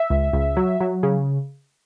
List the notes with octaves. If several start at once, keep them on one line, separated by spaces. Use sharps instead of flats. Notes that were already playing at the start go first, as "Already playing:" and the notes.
Already playing: E5
C#2
C#2
F#3
F#3
C#3